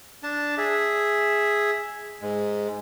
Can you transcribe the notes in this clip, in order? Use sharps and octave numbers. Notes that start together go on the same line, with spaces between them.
D4 A5
G#4 E5
G#2 G#3